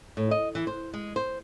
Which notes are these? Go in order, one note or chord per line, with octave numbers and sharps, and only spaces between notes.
A2
D#5
E3
C5
G#3
C5